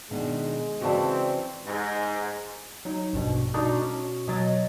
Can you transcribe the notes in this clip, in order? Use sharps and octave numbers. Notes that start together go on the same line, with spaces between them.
B2 D#3 G#3 D4
C#3 E3 C4 F#4 D5 A5
G#2
F#3 D#4
A#1 G2 B2
B2 D4 D#4 F#4 A4
C#4
B2 F#3 D#5 A6